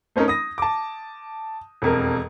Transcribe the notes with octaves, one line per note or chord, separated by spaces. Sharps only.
A3 C4 C#4 D#4 A#4
D#6 A#6
A5 D6
E1 F2 A#4